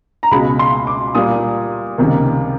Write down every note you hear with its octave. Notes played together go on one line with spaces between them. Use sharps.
A#5
C#2 B2 G#3 B5
C6
D6
A#2 G3 A#3 D#6
C#2 C3 D#3 G3 A#3